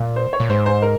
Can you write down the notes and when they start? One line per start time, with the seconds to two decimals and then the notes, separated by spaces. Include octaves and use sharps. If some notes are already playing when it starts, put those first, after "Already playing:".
Already playing: A#2
0.16 C5
0.33 C#5
0.40 A#2
0.49 G#2 C5
0.66 C5
0.82 A#4